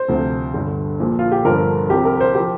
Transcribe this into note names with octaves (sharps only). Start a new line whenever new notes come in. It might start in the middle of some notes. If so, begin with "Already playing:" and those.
Already playing: C5
D2 C3 F3
G1 G2 D3
A#1 A#2 F3
F4
G4
G1 G2 D3 F3 A#4
C2 C3 F3 G4
A#4
C5
F3 G4